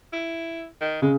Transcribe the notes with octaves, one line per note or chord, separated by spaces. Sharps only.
E4
D#3
C#3 G#3